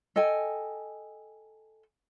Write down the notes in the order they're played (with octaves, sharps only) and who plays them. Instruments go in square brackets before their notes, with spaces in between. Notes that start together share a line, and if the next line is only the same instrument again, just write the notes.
[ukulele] A4 D#5 G5 G#5